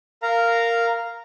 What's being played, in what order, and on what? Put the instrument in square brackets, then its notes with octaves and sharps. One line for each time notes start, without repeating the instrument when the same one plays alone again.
[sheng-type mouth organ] A#4 F5 A#5